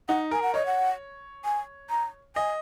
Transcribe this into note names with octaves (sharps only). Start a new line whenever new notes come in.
D#4 F#5
A#4 G#5
F#5
C#5 D#5
F#5
G#5
A#5
D#5 G#5